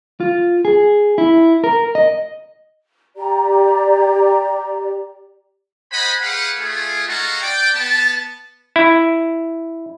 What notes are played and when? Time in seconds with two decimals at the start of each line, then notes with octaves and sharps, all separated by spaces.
0.20 F4
0.65 G#4
1.18 E4
1.64 A#4
1.95 D#5
3.17 G4 D5 A#5
5.92 C5 D#5 F#5 G#5 B5
6.21 G4 G#4 B4 F5 F#5
6.59 A3 F4 G#4
7.07 G#3 D#4 F#4 A4 F5 F#5
7.41 D5 G5
7.73 B3 A5
8.76 E4